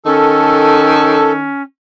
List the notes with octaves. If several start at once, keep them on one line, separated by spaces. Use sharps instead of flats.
D#3 C#4 A4